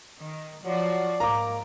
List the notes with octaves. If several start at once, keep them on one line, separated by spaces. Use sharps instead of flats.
D#3
F3 F#3 F#4 D5
G#2 A#3 A#5 D6